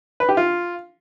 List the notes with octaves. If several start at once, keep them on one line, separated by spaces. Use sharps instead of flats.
B4
G4
F4